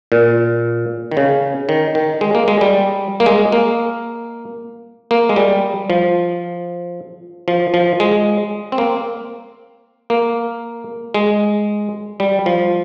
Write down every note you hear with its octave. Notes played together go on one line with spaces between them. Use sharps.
A#2
D#3
C#3
D#3
D#3
G#3
A#3
G#3
G3
A#3
G#3
A#3
A#3
G#3
G3
F3
F3
F3
G#3
C4
A#3
A#3
G#3
G3
F3